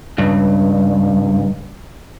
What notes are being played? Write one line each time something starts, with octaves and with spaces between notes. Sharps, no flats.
C#2 G2